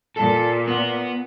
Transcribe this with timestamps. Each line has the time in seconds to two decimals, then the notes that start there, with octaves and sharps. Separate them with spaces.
0.16 A#2 A4
0.67 B3